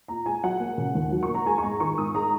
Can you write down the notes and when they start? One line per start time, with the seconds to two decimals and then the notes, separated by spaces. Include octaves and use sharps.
0.08 A#2 A#5
0.26 G#3 G#5
0.43 F#3 F#5
0.60 A#3
0.78 C#3
0.95 D#2
1.12 F#3
1.23 C#6
1.28 A#3
1.35 A#5
1.46 G#3 G#5
1.58 C#6
1.63 G#2 A#5
1.80 D#3 C#6
1.98 G#2 D#6
2.15 G#3 A#5